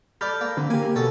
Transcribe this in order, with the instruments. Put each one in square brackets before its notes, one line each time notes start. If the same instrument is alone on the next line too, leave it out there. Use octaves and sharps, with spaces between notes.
[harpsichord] A4 D5 [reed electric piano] B5 F6 G6
[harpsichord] A#3
[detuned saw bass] D3 [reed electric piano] C4
[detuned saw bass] A#3 [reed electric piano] G4 A#4 [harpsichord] G#5
[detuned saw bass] B2 [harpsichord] C#4 A4